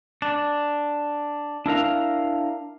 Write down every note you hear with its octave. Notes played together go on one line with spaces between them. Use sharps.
D4
D4 E4 A#4 F5